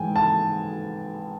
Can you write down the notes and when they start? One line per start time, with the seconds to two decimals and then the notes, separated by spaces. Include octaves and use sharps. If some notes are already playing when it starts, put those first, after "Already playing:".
Already playing: G#2 E3 G5 G#5
0.16 A5